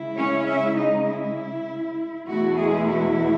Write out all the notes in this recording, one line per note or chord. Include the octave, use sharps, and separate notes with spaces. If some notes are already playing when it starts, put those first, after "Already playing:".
Already playing: C#3 G#3 E4
C#4 C#5
E4 E5
D#4 D#5
E4
E2 B2 A3 E4 F#4
G#3 G#4
F#4